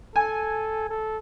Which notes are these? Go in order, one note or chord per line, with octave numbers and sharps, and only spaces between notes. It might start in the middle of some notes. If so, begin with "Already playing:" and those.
A4 G#5
A4